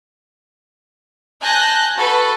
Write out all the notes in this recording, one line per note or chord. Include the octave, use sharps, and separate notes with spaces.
G#5 A5 F#6 G6 A#6
F#4 A4 B4